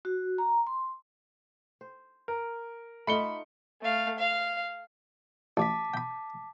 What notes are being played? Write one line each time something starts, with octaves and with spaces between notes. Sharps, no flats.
F#4
A#5
C6
C5
A#4
A3 D#4 F4 B5 C#7 G7
A3 F5
F5
A1 A5 D6 B6
G5 B5